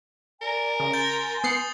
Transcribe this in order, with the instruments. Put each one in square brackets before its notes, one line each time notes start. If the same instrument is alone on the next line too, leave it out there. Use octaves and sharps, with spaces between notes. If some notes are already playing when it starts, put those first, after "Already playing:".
[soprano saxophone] A#4 [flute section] D5 G#5
[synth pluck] C#3
[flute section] G#5 C6 [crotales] G6 A6 G7
[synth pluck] B3 C7 C#7 [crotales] D#6 G6 F#7